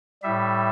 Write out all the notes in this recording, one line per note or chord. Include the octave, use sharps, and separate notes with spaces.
A2 G3 E5